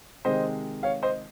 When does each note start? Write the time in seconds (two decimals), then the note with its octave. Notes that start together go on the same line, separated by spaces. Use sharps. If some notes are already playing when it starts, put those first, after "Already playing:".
0.25 C3 D#3 G#3 C5 D#5
0.83 C#5 F5
1.02 C5 D#5